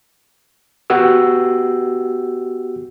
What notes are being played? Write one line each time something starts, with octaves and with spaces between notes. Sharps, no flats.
B3 F#4 G4 E6